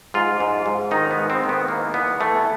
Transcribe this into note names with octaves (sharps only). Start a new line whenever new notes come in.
G#2 F4
G#2
G#2
D#3 D#4
B3
G#2
C4
D#3
B3
E3 A#3
E2 B3
E3 A3